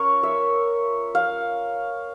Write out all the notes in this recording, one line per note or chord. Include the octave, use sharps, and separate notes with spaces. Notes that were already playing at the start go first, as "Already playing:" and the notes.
Already playing: C#4 F4 A#4 C#5
E5
F5